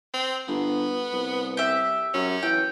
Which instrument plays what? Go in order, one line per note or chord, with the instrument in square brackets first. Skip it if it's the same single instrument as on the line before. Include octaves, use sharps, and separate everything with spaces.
[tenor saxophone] C4
[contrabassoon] G1 [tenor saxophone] B3
[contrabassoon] C2
[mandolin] G4 E5
[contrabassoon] F#2 [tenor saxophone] C#4
[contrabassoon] E3 [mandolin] G5